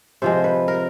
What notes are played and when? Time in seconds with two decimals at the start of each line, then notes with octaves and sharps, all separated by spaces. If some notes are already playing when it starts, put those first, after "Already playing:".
0.22 C3 F3 G#3 C5
0.44 B4
0.68 A#4